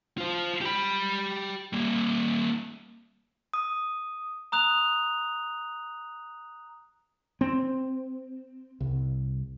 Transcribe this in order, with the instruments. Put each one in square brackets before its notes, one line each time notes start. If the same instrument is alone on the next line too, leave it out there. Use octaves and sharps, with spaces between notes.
[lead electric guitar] F4 C5
G4 B5
G3 A#3
[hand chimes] D#6
[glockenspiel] A#5 D#6 F#6 F7
[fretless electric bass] C4
C2